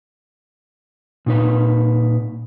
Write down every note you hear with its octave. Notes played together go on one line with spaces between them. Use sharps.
A#2 D#4 B4